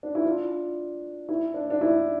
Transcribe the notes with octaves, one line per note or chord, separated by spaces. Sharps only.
D4
E4
D4 F4
E4
D4
D4
E4